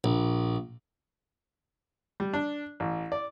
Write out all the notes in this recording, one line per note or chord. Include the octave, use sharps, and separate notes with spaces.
A#1
G3
D4
A1
D5